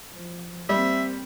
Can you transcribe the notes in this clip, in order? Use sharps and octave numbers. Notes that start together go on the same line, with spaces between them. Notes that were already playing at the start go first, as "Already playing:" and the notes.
F3
G3 A#3 C4 E5